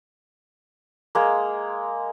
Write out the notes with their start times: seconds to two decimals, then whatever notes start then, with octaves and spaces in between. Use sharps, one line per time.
1.15 G#3 A#3